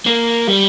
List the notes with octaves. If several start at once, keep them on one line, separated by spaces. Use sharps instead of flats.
A#3
G3